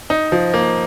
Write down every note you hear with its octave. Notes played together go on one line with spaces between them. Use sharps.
D#4
F3
A#3